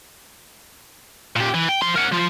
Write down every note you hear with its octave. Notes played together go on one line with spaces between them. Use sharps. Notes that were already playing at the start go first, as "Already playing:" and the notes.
A#2 G4
E3
G5
F3 C6
A#4 F#5
F3 F4